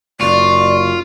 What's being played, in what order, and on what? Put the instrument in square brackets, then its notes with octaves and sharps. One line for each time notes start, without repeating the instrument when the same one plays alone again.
[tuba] F#1 [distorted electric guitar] F4 [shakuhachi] D5 [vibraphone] C#6